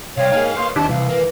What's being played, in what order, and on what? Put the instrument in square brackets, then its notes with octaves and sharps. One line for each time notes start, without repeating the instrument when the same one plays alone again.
[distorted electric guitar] C3 G3 [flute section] C#5 G5 [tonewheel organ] F5
[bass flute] A#3 [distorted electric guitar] D#4 G#4 [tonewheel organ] F5
[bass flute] A#3 [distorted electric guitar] B4 C#5 [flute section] C6 D#6
[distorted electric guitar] D#2 [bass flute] C4 [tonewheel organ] D4 E4 G4 [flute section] A5
[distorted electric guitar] C2 [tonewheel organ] E3 [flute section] F5
[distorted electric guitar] A#3 [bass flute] B4